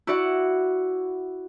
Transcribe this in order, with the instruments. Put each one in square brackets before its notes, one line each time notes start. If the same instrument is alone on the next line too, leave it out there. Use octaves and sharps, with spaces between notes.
[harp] E4 F#4 D5 F#5